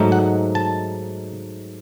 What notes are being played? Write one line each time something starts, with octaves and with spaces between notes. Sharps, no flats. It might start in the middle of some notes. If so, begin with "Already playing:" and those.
Already playing: G#2 F#3 A3 D#4
F#5
A5